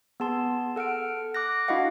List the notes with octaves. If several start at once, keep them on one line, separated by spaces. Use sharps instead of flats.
B3 G#4 A5 C6
A4 F#5 F6 D7
D6 F#6 A#6
D4 E4 F#4 D#5 F5 F#5